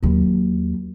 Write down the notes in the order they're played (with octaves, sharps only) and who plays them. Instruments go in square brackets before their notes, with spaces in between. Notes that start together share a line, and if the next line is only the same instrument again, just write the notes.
[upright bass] D#2 F#3